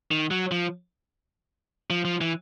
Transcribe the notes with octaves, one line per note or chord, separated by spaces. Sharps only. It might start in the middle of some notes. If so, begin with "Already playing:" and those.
D#3
F#3
F3
F3
F3
E3